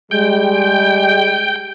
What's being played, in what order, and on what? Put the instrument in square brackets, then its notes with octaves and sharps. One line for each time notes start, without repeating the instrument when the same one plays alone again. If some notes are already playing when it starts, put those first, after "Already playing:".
[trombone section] G3 G#3 [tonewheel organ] G5